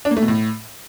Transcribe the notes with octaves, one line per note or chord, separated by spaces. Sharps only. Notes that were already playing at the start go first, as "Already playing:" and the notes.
D4
A#3
A3
B2
A2